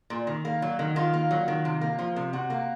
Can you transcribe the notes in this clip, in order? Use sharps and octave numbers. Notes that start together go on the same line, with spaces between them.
A#2
D#3
A#3
F#3
D#3
D#3 F4
A#3
F#3
D#3
C3
A#3
F3
C3
C3 F#4
A#3